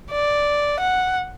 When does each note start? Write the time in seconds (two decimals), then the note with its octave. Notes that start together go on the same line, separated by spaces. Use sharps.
0.11 D5
0.80 F#5